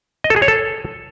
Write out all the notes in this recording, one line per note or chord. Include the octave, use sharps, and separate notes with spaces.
D#5
A4
G#4
C#5
A4